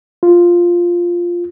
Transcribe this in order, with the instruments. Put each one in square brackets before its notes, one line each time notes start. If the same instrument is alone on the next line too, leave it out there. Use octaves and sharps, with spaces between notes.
[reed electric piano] F4